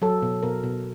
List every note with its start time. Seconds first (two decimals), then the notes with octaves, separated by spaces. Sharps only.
0.02 F#3 A4
0.22 B2
0.43 B2 A#4
0.63 B2